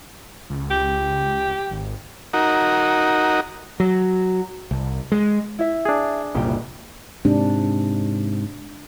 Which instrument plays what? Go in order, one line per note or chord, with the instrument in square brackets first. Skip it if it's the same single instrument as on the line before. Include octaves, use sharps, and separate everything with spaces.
[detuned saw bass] C#2
[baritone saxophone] G4
[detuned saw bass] G#1
[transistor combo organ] D#4 F#4 A#4
[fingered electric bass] F#3
C2
G#3
[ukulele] E4 E5
[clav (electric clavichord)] D4 G#4
[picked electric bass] F#1 C2 A#2 [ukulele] G4 G5
[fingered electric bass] G#2 C3 [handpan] D4